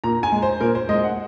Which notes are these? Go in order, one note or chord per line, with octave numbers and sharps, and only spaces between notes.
A#2 A#5
G#5
G#3
C5
A#2 A#4
C5
G#3 D#5
F#5